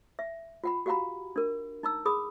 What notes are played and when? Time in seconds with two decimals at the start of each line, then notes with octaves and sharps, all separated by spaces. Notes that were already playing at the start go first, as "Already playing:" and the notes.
0.19 E5
0.64 F4 F#5 B5
0.86 F#4 G4 F5 F#5 A#5 B5
1.36 D4 A#4
1.83 D#4 A#5 E6
2.06 G#4 B5 D#6